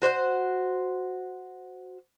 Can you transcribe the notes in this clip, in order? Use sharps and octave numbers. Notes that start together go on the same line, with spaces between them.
F#4 C5 C#5 F#5